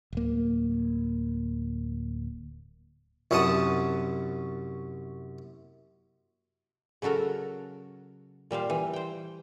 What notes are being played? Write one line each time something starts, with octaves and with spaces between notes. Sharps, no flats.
D1 A#3
C2 F#2 F#4 F#5 A5 D#6
C#3 F#3 F#4 A4 A#4
A#2 G3 C5 F5
E3
C5 G5